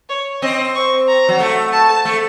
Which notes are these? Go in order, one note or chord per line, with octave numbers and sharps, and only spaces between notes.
C#5
C4 D#5
C#6
A#5
F#3
A3
A5
A3